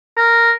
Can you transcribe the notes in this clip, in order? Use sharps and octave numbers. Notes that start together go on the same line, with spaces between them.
A#4